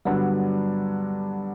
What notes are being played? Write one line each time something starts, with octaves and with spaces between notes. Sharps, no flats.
G2 D3 F#3 G3 B3 D4